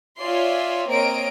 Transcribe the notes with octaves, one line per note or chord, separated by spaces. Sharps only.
F4 C#5 D5 E5 G#5 C6
A#3 C4 A#4 C#5 D#5 D7